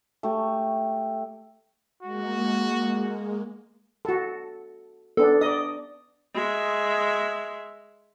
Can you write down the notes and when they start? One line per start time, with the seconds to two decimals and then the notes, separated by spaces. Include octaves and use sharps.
0.23 A3 G4
2.03 G#3 A#3 F#4
4.05 F#4 A4
5.17 B3 D4 A4
5.41 D5 D#5 D#6
6.34 G#3 E5